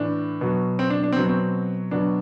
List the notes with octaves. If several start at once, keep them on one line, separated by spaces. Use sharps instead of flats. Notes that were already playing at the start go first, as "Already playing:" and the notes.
Already playing: A2 E3 D4
B2 F#3
C4
D4
D4
C4
B2 F#3
C4
B2 F#3 D4